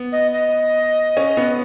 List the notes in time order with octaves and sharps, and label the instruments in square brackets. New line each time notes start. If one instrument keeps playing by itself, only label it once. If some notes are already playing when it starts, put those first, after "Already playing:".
Already playing: [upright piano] B3
[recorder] D#5
D#5
[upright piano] C#4
B3